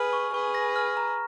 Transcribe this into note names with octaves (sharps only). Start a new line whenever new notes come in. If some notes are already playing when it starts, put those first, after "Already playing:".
Already playing: G#4 B4 F6
C#6
G#4 B4 C#6
A#6
F6
A#5